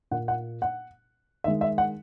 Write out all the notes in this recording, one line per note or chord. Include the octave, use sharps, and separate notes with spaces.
A#2 A#3 F#5
F#5
F#5
D#3 G#3 E5
E5
F#5